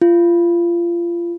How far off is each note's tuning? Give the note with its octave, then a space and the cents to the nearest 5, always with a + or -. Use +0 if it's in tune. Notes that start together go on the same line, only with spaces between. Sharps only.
F4 -25